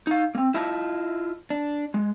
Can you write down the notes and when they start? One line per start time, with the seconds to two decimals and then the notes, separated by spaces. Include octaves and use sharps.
0.07 D#4 F5
0.35 A#3 C4
0.54 E4 F4 D#5 E5 A5
1.50 D4
1.94 G#3